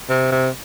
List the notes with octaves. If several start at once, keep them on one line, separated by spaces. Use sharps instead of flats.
C3
C3